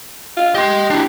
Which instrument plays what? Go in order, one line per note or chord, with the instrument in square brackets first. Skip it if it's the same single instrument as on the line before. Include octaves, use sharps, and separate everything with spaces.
[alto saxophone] F4
[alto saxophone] G4 [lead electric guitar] D#5 C6
[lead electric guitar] D4 E4